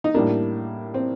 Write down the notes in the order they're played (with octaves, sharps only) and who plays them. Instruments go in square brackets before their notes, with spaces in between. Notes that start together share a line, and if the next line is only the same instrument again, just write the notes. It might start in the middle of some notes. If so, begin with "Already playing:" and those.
[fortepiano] D#4
[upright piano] A2 G3 A#3 [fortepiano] D4
[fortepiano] C4